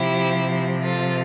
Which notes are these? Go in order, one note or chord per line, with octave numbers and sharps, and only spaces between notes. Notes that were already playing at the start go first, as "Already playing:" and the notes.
Already playing: C3 F3 E4 G4
F4 A4